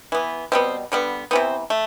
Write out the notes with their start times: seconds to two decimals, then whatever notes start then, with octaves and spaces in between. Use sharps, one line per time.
0.12 E3 B3
0.52 B2 G3 B3 C4
0.92 D3 G3 B3
1.31 C3 E3 B3 C4
1.70 A3